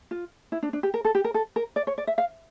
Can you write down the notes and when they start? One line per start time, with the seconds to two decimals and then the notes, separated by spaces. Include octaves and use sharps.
0.11 F4
0.52 E4
0.63 D4
0.73 D4
0.83 G4
0.94 A#4
1.05 A4
1.15 G4
1.24 A#4
1.34 A4
1.56 A#4
1.76 D5
1.87 C#5
1.98 D5
2.07 E5
2.18 F5